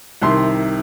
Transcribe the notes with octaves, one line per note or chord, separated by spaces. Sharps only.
C2 C3 D#3 C6